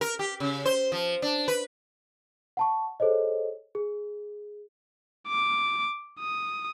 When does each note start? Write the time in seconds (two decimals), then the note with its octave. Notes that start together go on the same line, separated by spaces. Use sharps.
0.01 A#4
0.19 G4
0.40 C#3
0.65 C5
0.92 F3
1.22 D4
1.48 B4
2.57 F#5 A5 C#6
3.00 G#4 A4 C5 C#5 D#5
3.75 G#4
5.28 D6
6.20 D#6